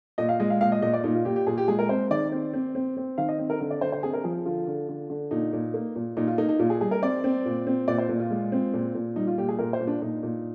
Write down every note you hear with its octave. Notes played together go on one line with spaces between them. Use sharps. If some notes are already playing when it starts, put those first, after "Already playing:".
A#2 D#5
F5
G#3 D#5
F5
A#2 F5
D#5
A#2 D#5
D5
A#2 D#4
F4
A#2 G4
G4
A#2 G#4
G4
G#3 G#4
A#4
C4 C5
D#3 D5
C4
C4
C4
C4
D#3 F5
D#5
C4
A#4
D3
D5
D3 C5
C5
C4 G#4
A#4
F3 G#4
D3 F4
D3
D3
D3
A#2 D#4
A#2
A#3
A#2
A#2 D#4
F4
A#3 D#4
D#4
A#2 F4
G#4
G3 G#4
A#4
C4 D5
C4
A#2
C4
A#2 D5
C5
A#2
F4
G#3
C4
A#2
A#2
G3 D#4
F4
A#2 G4
G#4
A#2 A#4
C5
A#2
D4
A#2 D#4
A#2